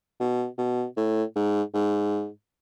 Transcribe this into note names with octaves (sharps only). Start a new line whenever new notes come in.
B2
B2
A2
G#2
G#2